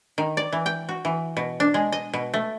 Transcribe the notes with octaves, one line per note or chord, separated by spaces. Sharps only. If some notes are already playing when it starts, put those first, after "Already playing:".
D#3
D5
E3
G5
F#4
E3
B2
D4
G#3
D#5
B2
A3